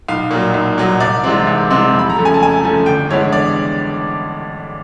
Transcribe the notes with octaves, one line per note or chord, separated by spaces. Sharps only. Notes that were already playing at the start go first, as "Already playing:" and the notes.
B1 F5
A#2 F#3
B1
A#2 F#3
C2 D5
C3 E3 G#3 C4
C2
C3 E3 G#3 C4
F2
B5
A#5
C#3 F3 A3
G#5
A5
F2 G#5
C#3 F3 A3
G1 G5
G2 E3 G#3 B3 C#5
D5